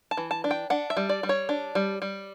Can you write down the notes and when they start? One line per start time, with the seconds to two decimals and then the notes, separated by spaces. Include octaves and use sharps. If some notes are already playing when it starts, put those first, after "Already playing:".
0.11 A5
0.17 E3
0.31 A5
0.44 D4
0.51 G5
0.70 D4 F#5
0.90 E5
0.97 G3
1.09 D5
1.23 G3
1.29 C#5
1.49 D4
1.75 G3
2.02 G3